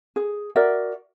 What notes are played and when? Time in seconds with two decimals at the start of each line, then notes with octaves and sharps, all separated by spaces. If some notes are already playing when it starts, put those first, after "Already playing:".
0.16 G#4
0.56 F#4 A#4 D5 E5